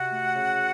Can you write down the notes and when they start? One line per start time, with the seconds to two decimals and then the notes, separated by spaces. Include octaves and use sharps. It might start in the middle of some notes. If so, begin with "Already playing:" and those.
Already playing: C3 F#4 F#5
0.10 A3
0.35 C#3